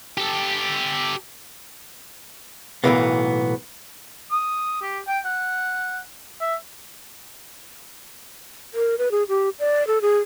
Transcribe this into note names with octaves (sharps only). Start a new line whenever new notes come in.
G4 A4
B1 E2 A2 E3 A#3 B3
D#6
G4
G5
F#5
E5
A#4
B4
G#4
G4
D5
A4
G#4